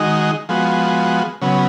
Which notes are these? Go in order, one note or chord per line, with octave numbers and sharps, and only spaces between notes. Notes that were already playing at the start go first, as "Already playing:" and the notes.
Already playing: D#3 G#3 D#4 F#4
F3 G#3 B3 F#4
C#3 F#3 B3